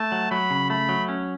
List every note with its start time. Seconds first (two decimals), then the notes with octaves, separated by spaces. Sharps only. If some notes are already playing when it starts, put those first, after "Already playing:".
Already playing: A3 A5
0.12 F#3
0.31 F#3 B5
0.50 C#3
0.70 A3 B5
0.89 F#3
1.09 C#4